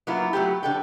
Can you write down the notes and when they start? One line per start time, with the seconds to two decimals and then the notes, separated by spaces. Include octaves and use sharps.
0.07 F#3 A#3 B3 E4 F4
0.33 F#3 A3 B3 G4
0.63 D3 A4 G5